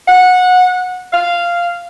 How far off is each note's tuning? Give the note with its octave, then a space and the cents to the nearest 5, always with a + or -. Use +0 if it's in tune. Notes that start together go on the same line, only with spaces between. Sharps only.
F#5 -20
F5 -10